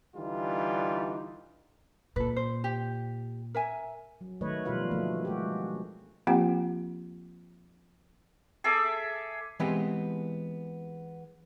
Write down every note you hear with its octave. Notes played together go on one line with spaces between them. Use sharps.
D3 E3 G3 D#4 F4
A#2 A4 B4
C5
G4
A#4 E5 G#5
F#3
D#3 F#3 A3 B4 C#5 D#5
B2 F3 G3 F4 B4 F5
D3 F3 A3 A#3
G#3 F#4 G4
F3 A#3 C4 F4 G4 F#5
G#4 A4 E5 D6
E3 G#3 B3 C4 G4 B4